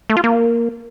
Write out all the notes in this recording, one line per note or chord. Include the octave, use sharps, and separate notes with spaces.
A3
F4
A#3